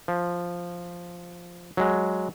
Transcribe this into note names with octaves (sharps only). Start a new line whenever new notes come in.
F3
F#3 G#3